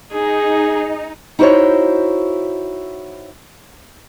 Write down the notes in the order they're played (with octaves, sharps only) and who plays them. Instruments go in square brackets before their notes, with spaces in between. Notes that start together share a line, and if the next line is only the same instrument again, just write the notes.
[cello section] D#4 [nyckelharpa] G#4
[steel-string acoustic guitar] D#4 E4 F#4 C5 C#5